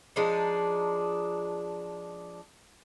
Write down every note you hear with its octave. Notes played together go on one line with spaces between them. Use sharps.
F3 G#3 D4 D#4